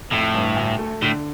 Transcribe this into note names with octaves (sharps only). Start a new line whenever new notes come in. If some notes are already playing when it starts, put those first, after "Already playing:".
F2 A2
G1
D2
A3
A2 D3